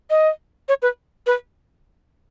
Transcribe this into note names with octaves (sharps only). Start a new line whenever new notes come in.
D#5
C#5
B4
B4